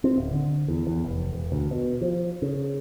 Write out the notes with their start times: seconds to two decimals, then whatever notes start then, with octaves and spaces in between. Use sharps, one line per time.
0.04 C4
0.18 D1
0.32 D3
0.68 E2
0.87 E2
1.04 F1
1.33 E1
1.52 D2
1.71 B2
2.01 F3
2.42 C#3